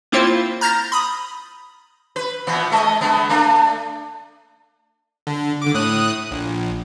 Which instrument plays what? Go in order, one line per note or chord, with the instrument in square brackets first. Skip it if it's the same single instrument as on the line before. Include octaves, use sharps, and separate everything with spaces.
[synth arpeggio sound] A#3 C4 E4 F4 C5
A#5 F6 G6 A6 A#6
B5 D#6
[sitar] B4
A#2 E3 B3
G#3 D#5
D3 G#3 B3
A3 D4
[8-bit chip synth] D3
D3 D6
A2 D#6 F#6
A#1